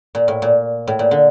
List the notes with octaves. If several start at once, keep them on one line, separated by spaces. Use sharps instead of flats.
A#2
A2
A#2
A2
A#2
D3